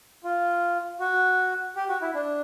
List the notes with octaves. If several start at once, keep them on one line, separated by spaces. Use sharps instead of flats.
F4
F#4
G4
F#4
E4
D4